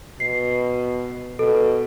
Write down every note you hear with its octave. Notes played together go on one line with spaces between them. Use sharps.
B2 C7
B2 A4